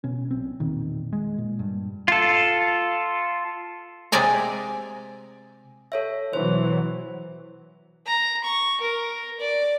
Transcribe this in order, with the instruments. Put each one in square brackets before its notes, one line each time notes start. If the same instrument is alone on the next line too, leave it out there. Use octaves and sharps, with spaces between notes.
[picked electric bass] B2 C#4
B1 C4
E1 A#2 D#3
G#3
A#2
G2
[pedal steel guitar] F4 A4
[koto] C3 G#3 C4 D5 G#5 A#5
[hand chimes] A4 C#5 E5
[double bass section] B2 E3 F#3 [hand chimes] C5
[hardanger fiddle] A#5
C#6
A#4
D5